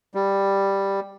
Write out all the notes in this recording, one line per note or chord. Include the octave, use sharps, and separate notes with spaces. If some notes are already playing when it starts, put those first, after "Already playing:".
G3